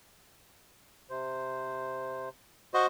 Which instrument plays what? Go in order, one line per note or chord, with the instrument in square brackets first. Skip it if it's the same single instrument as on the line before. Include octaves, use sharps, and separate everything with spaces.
[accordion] C3 C5
[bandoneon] F#4 C5 D#5